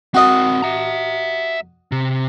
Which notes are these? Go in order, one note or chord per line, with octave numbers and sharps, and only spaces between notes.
C4 F#4 A#4 D#5
E5 A#5
C3